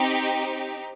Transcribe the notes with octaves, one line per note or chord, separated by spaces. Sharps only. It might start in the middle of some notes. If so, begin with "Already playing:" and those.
Already playing: C4 D#4 G4